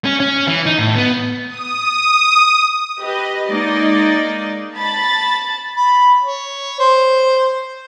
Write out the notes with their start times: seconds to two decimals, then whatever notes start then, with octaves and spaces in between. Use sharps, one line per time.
0.05 C#4
0.20 C#4
0.47 E3
0.66 D#4
0.79 A2
0.95 B3
1.48 D#6
2.99 G4 B4 D#5
3.49 G#3 A#3 D#4 D5 D#5
4.76 A5 B5 A6
5.76 B5
6.23 C#5
6.79 C5